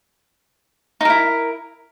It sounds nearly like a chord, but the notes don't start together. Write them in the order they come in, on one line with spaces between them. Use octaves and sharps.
D#4 A#4 E4